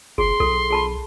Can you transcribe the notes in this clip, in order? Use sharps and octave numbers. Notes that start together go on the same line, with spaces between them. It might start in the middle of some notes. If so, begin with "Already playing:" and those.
F#1 G#4 C6
B1 A4
G#4 A5 B5